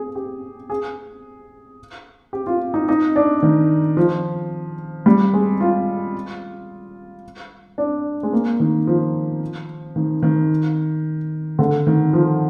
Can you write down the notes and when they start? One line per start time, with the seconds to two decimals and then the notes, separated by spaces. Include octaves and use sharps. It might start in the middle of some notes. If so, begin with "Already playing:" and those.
Already playing: G#4
0.15 G4
0.70 G#4
2.33 G4
2.47 F4
2.74 D#4
2.89 D#4
3.16 D4
3.43 D#3
3.97 F3
5.06 G3
5.34 G#3
5.60 F4
7.78 D4
8.23 G#3
8.33 A#3
8.60 D#3
8.87 F3
9.96 D#3
10.23 D#3
11.59 D3
11.87 D#3
12.13 F3